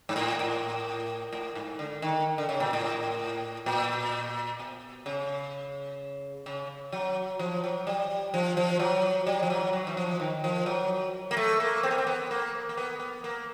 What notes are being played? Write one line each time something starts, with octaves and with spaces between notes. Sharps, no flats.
G#2
A2
A2
A2
G#2
D3
D#3
D3
C#3
A#2
A2
A#2
B2
C#3
C#3
F#3
F3
F#3
G3
F3
F3
F#3
G3
F3
F#3
F#3
E3
F3
D#3
F3
F#3
A#3
A3
A#3
C4
B3
C4
B3
A#3
A#3
B3
B3
A#3